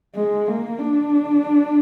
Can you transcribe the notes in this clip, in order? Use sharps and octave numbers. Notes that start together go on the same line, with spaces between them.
G#3
A#3
D4